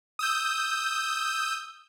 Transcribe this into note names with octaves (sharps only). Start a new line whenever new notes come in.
D#6 E6 G6